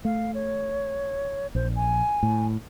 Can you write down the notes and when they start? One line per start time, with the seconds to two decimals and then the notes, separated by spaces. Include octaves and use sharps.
0.05 A3 F5
0.34 C#5
1.55 A#1 C5
1.76 G#5
2.23 A2